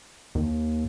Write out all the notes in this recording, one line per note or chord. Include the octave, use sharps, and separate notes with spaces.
D#2